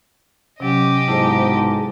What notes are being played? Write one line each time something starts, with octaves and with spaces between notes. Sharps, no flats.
C3 F#3 C#4 G4 D#5
B1 G#2 E4 C5 A5